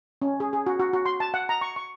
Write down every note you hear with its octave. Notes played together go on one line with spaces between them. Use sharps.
C#4
G#4
G#4
F#4
F#4
F#4
C6
A5
F#5
A#5
C#6
C#6